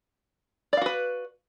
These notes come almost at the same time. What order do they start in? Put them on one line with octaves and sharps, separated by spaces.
D5 F5 F#4 B4